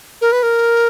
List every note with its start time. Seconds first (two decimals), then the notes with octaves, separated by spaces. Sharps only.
0.21 A#4
0.32 B4
0.43 A#4